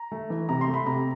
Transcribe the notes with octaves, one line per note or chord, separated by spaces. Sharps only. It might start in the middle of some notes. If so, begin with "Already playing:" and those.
Already playing: A#5
A3
E3
C3 A#5
C6
A3
B5
C3 A#5